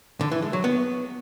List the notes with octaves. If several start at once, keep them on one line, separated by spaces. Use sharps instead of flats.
D3
E3
G#3
F#3
B3